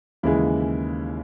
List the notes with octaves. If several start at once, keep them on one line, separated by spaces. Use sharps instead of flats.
D#2 C#3 E3 G#3 E4